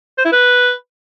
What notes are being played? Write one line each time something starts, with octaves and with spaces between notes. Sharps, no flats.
C5
E4
B4